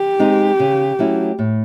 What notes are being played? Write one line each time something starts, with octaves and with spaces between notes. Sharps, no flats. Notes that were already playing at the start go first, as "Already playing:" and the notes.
Already playing: G4
G#3 C4 D#4
C#3
F#3 A3 C#4 E4
A2